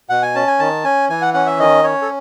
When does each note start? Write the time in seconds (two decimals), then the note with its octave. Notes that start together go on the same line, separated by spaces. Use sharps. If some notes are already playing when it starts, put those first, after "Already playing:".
0.09 B2 F#5
0.22 G#5
0.35 C#4 A5
0.48 G#5
0.59 D#3 A5
0.84 C#4 G#5
1.09 E3 G#5
1.22 F#5
1.34 C#4 F#5
1.46 E5
1.59 D#3 D#5
1.84 C#4 C#5
2.02 A4